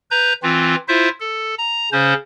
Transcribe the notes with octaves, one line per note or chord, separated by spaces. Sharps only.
B4 A#5 G6
E3 C4 F4
E4 F4 C5 E5
A4
A#5
C#3 C#4 C5